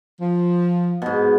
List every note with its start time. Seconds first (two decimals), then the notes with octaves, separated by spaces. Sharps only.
0.21 F3
1.02 G#2 B2